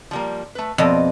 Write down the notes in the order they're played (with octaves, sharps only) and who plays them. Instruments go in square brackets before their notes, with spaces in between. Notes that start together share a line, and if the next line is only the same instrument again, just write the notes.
[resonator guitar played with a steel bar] F3 G3 A#3
A3 B4
[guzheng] F2 B2 [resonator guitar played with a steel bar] A#3 D5 D#5